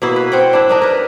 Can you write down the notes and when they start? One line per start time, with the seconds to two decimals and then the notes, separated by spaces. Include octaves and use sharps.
0.02 B2 A#3 E4
0.16 B4
0.32 C4 F#5 G5
0.53 D4 E4
0.69 D4 D#4 A#4
0.82 A#4 B4